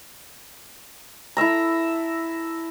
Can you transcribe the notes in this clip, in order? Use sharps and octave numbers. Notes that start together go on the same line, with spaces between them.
E4 A4 E5 A#5